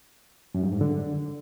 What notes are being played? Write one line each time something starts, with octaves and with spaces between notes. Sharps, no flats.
F#2
G2
G#2
D3